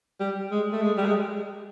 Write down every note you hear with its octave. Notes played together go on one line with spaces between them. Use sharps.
G3
G#3
A3
G#3
G3
G#3